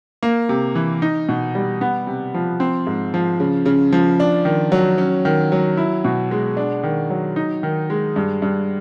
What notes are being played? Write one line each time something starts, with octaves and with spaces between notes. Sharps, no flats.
A#3
C3
E3
D#4
B2
G3
B3
C3
F3
C4
G#2
F3
C#3
C#3
F3
D4
D#3
F#3
C#4
D#3
F#3
E4
B2
G#3
D4
D#3
F#3
D#4
D#3
G#3
G2
G2